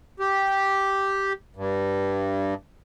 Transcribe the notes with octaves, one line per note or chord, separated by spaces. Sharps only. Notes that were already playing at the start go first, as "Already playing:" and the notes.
G4
G2